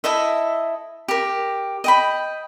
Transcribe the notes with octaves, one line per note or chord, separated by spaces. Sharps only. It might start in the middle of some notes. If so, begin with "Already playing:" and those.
E4 A4 D#5 E5
G4 A#4
D#5 G5 B5